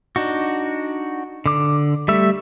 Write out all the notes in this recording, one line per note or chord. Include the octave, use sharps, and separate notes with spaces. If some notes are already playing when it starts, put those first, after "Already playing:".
D4 D#4 F#4
D3 D6
G3 A3 E5